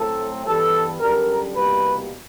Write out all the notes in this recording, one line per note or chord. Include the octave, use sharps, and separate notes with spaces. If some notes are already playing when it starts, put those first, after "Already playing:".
Already playing: A2 F#3 A3 C4 A4
G2 E3 G3 B3 A4
F#2 D3 G3 A#4
C2 B2 G3 A#3 B4